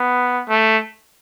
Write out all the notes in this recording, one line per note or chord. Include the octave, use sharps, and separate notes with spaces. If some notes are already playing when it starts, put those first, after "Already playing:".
Already playing: B3
A3